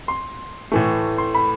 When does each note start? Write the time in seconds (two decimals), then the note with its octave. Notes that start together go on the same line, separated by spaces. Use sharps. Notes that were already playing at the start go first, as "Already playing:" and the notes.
0.08 C6
0.72 A2 E3 A3
1.18 C6
1.35 B5